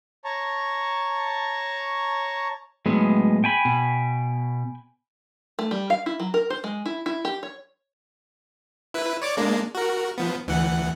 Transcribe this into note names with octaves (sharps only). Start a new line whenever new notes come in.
C#5 A5 A#5 C#6
A2 F#3 G#3 B3
G5 G#5 B5
B2
A3
G3
F5
E4
F#3
A#4
C5
G#3
E4
E4
G4
C#5
E4 B4
C#5 D5 D6
G#3 A#3 D4
F#4 A#4
F3 B3
D2 E3 F#5